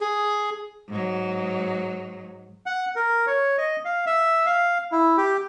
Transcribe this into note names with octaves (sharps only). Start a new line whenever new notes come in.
G#4
G#2 F#3
F#5
A#4
C#5
D#5
F5
E5
F5
E4
G4